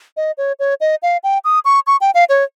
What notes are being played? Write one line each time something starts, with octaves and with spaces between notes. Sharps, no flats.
D#5
C#5
C#5
D#5
F5
G5
D#6
C#6
C#6
G5
F5
C#5